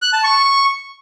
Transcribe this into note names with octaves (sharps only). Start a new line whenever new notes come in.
F#6
A5
C#6